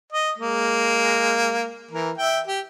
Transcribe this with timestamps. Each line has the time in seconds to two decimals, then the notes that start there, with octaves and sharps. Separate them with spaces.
0.12 D#5
0.37 G#3 A#3
1.91 E3 A#4
2.18 E5 G5
2.47 G4